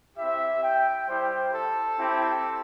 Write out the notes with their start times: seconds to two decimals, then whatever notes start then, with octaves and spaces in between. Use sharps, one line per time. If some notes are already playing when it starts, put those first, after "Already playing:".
0.17 C4 E4 G4 E5
0.62 G5
1.07 G3 E4 G4 C5
1.52 A4
1.98 C4 E4 G4